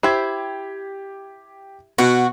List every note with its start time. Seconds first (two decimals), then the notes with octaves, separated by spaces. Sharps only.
0.03 E4 G4 C5 G#6
1.98 B2 F#4